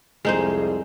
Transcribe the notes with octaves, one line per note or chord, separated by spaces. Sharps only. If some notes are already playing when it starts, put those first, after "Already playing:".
C2 F2 G#3 D#4 G#4 C5